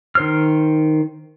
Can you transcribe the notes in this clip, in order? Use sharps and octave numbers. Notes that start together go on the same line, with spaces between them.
D#3 C5 F6